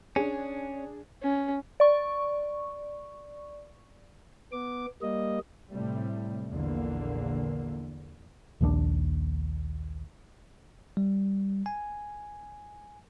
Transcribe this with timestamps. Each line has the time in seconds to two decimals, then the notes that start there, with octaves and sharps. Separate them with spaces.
0.16 C#4 D4 G#4
1.22 C#4
1.80 D5 C#6
4.52 B3 D6
5.02 G3 A#3 D#5
5.73 A2 C3 G3 A3
6.49 A#1 E2 D3 A#3
8.61 A#1 D#2 F3 D4
10.97 G3
11.66 G#5